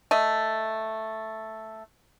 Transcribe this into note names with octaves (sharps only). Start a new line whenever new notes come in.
A3 D#5